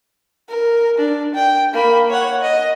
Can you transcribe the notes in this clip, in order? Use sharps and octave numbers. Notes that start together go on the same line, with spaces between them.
A#4
D4
G5
A#3 B5
C#5 F#5
D#5